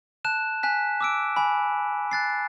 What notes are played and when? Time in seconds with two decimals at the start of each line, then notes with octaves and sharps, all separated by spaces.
0.25 A5 F#6 E7
0.63 G#5 F#6 B6
1.01 D6 E6 D7
1.36 G#5 B5
2.11 F#6 A6 C7